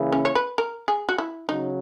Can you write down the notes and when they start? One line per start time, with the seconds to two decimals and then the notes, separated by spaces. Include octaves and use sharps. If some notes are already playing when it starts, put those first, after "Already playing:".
Already playing: C#3 E3 A#3 E4 G#4
0.12 C#4
0.25 C#5
0.35 B4
0.58 A#4
0.88 G#4
1.09 F#4
1.18 E4
1.48 C#3 F#3 D#4